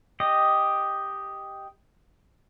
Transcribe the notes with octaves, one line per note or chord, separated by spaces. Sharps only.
G4 D#5